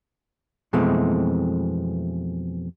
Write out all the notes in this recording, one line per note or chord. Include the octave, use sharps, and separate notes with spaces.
F2 B2 E3 G#3 A3 C4